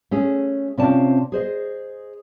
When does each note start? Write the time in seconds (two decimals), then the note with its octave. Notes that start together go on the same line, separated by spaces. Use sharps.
0.11 A3 C#4 G#4
0.78 C3 C4 C#4 F4 D5 A5
1.32 G#4 C5 D#5